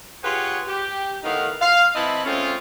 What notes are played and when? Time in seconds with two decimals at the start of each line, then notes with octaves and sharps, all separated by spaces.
0.24 F4 G4 G#4 B4 C#5 F#5
0.67 G4
1.24 A2 D#3 B3 D#4 F5
1.61 F5
1.95 E3 C4 E4 D#5 A5 B5
2.25 G#3 A3 C4 C#4 F4